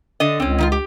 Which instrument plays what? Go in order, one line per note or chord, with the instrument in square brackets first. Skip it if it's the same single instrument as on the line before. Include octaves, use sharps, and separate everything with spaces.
[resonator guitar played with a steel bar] D3 D#5
[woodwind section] C#2 [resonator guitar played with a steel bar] C4 C#4
[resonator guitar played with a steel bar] D#3 E4 F4
G4